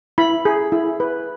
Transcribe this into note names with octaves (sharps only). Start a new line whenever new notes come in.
E4 B5
G#4
E4
B4